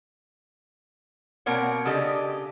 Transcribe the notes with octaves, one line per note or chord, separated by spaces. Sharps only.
B2 A#3 C4 A#4 C#5 F#5
C#3 D4 G4 A4 D#5